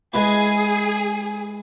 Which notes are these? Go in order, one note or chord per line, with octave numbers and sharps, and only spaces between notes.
G#3 E4 G#4 B4